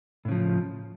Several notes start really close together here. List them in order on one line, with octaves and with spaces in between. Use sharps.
A2 C#3 F3